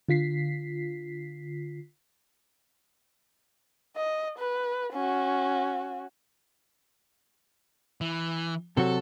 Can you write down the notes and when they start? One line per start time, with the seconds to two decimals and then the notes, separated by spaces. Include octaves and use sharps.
0.09 D3 F4 B6 C7
3.96 D#5
4.39 B4
4.93 C#4 F#4
8.01 E3
8.77 C3 F#3 F#4 A4